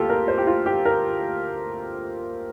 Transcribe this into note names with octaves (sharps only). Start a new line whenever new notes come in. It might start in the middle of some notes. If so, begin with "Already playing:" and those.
Already playing: D2 A#3 F4 G4 A4
A#4
C5
G4
F4
G4
A#4